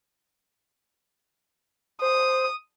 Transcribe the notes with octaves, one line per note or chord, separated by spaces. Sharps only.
C5 D#6